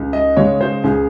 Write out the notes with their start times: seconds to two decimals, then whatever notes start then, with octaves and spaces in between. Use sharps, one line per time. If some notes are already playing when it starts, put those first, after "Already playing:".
Already playing: C#2
0.13 D#5
0.37 C#3 G#3 C#5
0.61 C5
0.84 C#2 G#4